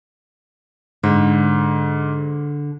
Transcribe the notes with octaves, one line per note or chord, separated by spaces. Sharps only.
G#2 D3